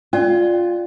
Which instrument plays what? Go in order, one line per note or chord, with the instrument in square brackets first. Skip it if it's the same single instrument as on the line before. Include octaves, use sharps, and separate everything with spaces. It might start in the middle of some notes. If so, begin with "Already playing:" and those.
[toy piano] C#4 D5 [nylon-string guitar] F4